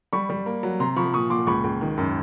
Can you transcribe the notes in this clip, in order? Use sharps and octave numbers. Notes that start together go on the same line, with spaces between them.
G3 B5 C#6
G3
A#3
F#3
C3 A#5 C6
F3 B5 C#6
A#2 C#6 D#6
A#2 C6 D6
C#2 B5 C#6
C#2
D#3
F#2